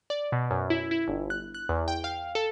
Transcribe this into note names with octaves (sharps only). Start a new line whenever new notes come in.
D5
B2
F#2
E4
E4
G1
F#6
F#6
E2
G5
F5
A4